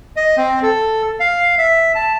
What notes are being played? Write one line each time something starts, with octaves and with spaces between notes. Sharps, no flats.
D#5
C4
A4
F5
E5
A5